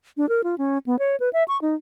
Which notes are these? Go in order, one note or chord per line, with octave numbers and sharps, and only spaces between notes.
D4
A#4
F4
C#4
B3
C#5
B4
E5
C#6
D#4